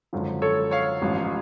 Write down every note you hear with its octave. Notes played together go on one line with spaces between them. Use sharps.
G#1 F#2 D3 F3
A4 C#5
C#5 F5
A1 G#2 F3